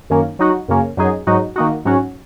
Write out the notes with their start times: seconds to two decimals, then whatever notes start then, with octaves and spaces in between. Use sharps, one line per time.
0.10 F#2 D#3 A#3 C#4
0.39 F#3 D#4 F#4
0.68 F#2 C#3 A#3 C#4
0.97 F#2 F#3 D#4 G#4
1.27 G#2 F#3 D#4 F#4
1.56 D#3 A#3 D#4 F#4
1.85 G#2 F#3 C#4 F#4